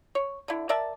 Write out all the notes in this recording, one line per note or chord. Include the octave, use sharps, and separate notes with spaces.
C#5
D3 E4
A#4 D5 E5 A5